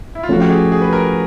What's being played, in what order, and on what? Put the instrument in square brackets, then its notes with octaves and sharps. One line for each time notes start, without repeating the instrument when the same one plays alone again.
[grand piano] E4
F4
[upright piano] F3 A3 C#4 [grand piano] F#4
[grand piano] G4
G#4
G#4
B4
A#4